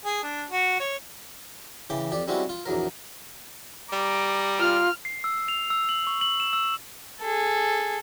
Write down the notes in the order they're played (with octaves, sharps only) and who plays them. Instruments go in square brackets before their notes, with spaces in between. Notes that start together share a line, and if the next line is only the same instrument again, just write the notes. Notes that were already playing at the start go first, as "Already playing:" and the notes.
[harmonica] G#4
D4
F#4
C#5
[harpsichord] C#3 E3 G5 D6
F2 G4 D5
G3 G#3 C4 C#4 E4 F#4
F4
A#1 E2 F#3 A#4
[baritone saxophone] G3 [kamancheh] A#5 D6
[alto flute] F4 [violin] F6
[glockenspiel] C7
E6
F7
E6
F#7
C#6
F#7
E7
E6
[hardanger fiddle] G#4 A4